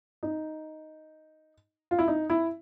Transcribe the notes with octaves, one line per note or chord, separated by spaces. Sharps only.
D#4
F4
E4
D#4
E4